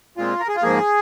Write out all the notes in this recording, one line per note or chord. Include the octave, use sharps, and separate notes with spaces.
A#2 G#3 C4 F4
A#4
G#4
F4
G#2 F3 A#3 G#4